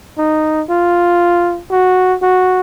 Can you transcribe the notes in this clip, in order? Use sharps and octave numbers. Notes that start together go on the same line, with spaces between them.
D#4
F4
F#4
F#4